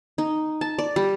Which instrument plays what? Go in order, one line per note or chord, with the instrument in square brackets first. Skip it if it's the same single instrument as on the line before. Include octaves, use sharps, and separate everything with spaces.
[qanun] D#4
A5
D5
G3